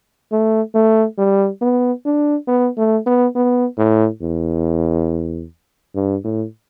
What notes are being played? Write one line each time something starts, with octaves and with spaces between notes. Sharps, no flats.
A3
A3
G3
B3
D4
B3
A3
B3
B3
A2
E2
G2
A2